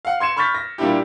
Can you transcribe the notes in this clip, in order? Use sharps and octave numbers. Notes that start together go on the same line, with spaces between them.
F5 F#5
C6 G#6 C#7 E7
B5 C#6 F6 G6 A6 B6
A#6
A#2 G3 A#3 D4 E4 G4